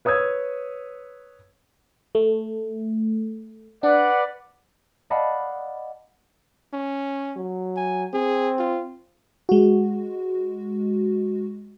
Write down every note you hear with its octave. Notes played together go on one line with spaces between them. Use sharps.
B4 C#5 D#6 E6 G#6
A3
D4 B4 D5 F#5
D5 D#5 F5 F#5 A5 B5
C#4
F#3
G#5
C4 G#4
F4
G#3 F#4